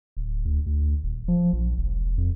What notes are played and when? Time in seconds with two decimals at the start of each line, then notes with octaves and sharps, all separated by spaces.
0.17 D1
0.45 D2
0.66 D2
1.04 D#1
1.28 F3
1.53 A#1
1.78 E1
2.18 F2